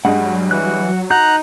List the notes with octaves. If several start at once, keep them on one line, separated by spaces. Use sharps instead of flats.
G2 G3 G#3 F#5
F#3
E3 F#4 F#6
D#4 F#4 A#5 F#6 G6